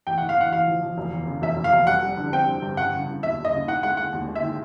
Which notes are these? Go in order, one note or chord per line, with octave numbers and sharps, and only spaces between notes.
A1 G5
A2 F#5
F5
A2 F#5
A1 F5
F3
F3
F1
E2
C#3
F1 E5
F1
F5
F1
G3 F#5
G3
D3
C4 G5
G3
G2
C#3 F#5
C#3
C#3
D#2 E5
D#2
D#5
C#3
D#3 F#5
G#3 F#5
G#3 F#5
D#2
G#3
E5
D#3